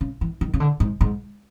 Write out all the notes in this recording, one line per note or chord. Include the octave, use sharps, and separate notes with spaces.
C#3
E3
D#3
C#3
D3
G#2
G#2